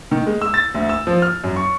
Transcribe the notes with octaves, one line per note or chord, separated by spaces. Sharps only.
D#3
G#3
E6
A6
D2
E6
F3
F6
F#2
C#6